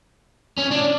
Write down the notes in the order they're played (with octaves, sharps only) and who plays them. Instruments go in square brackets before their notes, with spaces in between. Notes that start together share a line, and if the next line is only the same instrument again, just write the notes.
[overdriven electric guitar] C#4
D4